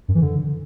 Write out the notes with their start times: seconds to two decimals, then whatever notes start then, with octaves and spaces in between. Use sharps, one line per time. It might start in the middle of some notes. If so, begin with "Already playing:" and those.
0.08 F#2
0.15 E3
0.21 D3